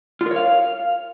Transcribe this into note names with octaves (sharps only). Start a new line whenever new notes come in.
F4
A#4
C#5
F5